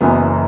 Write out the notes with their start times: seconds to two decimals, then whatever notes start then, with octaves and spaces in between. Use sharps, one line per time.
0.01 F#1 F#2 E3 B3